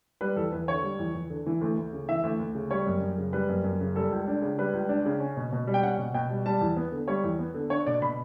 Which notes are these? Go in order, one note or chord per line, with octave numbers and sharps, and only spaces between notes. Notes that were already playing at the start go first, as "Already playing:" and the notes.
G3 B4
E2 A4
E2 B4
D3 C#5
G3
E2
E2
D3
E3
D2
D2
C#3
E3 E5
D2
D2
C#3
G3 C#5
F#2
F#2
C#3
G3 B4
F#2
F#2
C#3
G3 A4
C#2
D4
C#3
G3 B4
C#2
D4
C#3
C#4
B2
B2
G3
G5
C#4 F#5
B2
B2 G5
G3
G3 A5
E2
B3
D3
G3 C#5
E2
B3
D3
D4 C#5
B2 D5
B2 B5